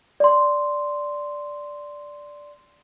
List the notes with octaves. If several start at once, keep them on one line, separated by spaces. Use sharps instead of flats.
D5 C6